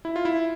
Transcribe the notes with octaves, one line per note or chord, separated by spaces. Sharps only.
E4
F4
E4